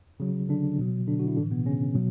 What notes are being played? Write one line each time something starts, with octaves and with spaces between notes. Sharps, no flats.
C#3 F#3
D3 D4
B2 F#3
D3 D4
F#4
E4
A2 D3 E3 D4
B2 B3
C#3 C#4
B2 F#3